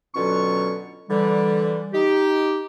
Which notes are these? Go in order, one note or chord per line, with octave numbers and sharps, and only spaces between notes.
B2 D3 F#3 C#4 F4 C#6
D3 E3 G3
D#4 G4